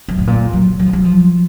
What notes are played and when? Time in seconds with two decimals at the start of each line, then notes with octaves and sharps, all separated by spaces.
0.08 F#2
0.19 A2
0.27 A#2
0.53 F#3
0.79 F#3
0.86 F3
0.93 F#3
1.05 F3